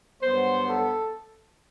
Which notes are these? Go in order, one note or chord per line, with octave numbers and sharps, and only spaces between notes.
G2 F#3 B3 C5
A4